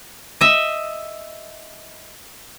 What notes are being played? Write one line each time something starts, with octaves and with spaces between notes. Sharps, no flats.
D#5 E5